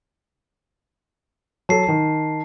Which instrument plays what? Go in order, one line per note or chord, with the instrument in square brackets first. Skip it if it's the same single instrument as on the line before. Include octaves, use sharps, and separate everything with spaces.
[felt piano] F#3 A4 [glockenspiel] A5 C7
[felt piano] D#3